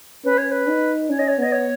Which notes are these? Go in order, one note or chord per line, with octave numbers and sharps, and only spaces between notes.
C#4 B4
C#5
B4
D#4
C#4 C#5
D#5
C#5
B3 D#5
C#5